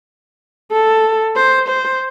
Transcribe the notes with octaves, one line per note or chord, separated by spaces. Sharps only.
A4
C5
C5